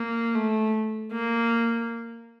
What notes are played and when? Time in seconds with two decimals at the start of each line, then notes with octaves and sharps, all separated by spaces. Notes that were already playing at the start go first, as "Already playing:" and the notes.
Already playing: A#3
0.35 A3
1.13 A#3